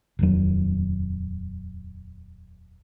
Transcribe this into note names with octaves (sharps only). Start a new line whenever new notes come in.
D#1 F2 F#3